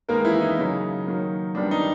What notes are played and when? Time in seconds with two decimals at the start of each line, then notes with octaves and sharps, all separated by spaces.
0.09 D#3 G#3 A#3 B3 A#4
0.25 E3 E4
0.40 D#4
0.57 C#3 F#3 A#3
1.06 D#3 F#3 A#3
1.55 D#3 G3 B3 D4
1.71 D#4